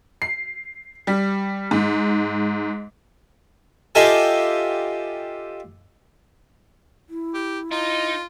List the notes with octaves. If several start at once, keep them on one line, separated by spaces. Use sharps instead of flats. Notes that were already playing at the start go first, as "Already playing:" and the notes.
C7
G3
G#2
F4 G4 A4 D#5 E5 G#5
E4
G4
D#4 F4